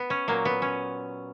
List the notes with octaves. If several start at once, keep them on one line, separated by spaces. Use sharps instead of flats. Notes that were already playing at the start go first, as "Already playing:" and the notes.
Already playing: B3
C#4
A#2 F#3 A#3
B3
C#4